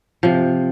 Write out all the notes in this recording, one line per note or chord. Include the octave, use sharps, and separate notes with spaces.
C3 F3